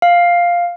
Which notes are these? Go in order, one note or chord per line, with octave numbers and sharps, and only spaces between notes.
F5